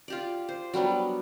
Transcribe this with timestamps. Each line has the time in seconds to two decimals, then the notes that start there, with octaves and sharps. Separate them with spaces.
0.08 F4 G4 D5
0.49 C5
0.74 F#3 G3 B3 D4